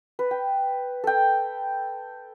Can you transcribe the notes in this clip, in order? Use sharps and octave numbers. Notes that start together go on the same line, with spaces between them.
B4
G5
A4 G5